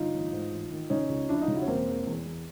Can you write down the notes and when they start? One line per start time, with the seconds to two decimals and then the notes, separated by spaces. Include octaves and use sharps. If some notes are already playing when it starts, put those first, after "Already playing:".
Already playing: G1 D#4 F4
0.13 A1
0.32 G#2
0.52 A1
0.71 D#3
0.90 C#3 C#4 D#4
1.09 C#2
1.29 F3 D4 E4
1.41 D#4 F4
1.48 C#3
1.55 E4 F#4
1.62 C#4
1.67 E1 A#3 C4
1.87 E2
2.06 E2
2.25 E2